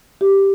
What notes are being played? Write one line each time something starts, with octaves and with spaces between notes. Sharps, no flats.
G4